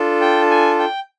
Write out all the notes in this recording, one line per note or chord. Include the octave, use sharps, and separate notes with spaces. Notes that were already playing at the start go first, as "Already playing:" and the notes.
Already playing: D4 F4 A4
G5
G#5
G5